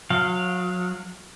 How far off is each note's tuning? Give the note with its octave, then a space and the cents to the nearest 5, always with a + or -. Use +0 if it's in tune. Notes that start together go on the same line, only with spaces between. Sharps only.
F#3 -35 F5 -10